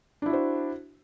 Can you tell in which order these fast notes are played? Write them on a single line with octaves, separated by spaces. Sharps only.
D4 E4 F#4 C5